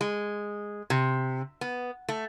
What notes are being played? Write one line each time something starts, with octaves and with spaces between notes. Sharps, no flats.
G#3
C3
B3
A3